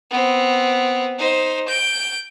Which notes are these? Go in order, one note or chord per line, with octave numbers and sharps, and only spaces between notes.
B3 C4
D#4 C5
G6 D7